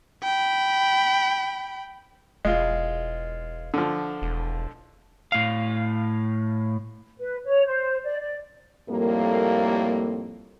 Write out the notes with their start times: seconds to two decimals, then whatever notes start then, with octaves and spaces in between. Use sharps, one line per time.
0.23 G5 B5
2.45 E1 G#3 F4
3.74 D3 F3
4.22 E1
5.32 A2 F5
7.19 B4
7.44 C#5
7.66 C5
8.04 D5
8.19 D5
8.89 F2 A2 G3 A#3